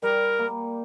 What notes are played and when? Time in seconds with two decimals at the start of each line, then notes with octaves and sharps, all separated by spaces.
0.02 G3 A#4
0.39 A#3